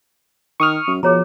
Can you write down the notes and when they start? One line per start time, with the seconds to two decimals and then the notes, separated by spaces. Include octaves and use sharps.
0.60 D#3 C#6 D#6 F6
0.88 F#2
1.03 B2 F3 G#4 C#5 A#5